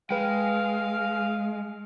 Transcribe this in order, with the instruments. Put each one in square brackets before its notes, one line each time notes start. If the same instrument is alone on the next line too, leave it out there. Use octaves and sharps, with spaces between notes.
[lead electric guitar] G#3 [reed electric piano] B4 G5 [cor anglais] F5